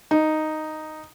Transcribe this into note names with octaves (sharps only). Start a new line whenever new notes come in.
D#4